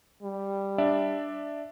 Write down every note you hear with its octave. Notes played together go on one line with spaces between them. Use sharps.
G3
D4 D5 E5